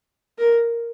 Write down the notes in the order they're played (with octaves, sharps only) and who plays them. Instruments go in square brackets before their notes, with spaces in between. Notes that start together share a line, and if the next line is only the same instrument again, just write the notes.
[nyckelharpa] A#4